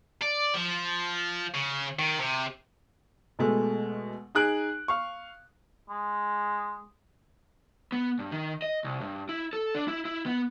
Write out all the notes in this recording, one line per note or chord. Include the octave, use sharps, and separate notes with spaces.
D5
F3
C#3
D#3
C3
B2 G#3 A3
D#4 G#4 F#6 D7
F5 C#6
G#3
B3
G2
D#3
D#5
C2
G2
E4
A4
D4
E4
E4
B3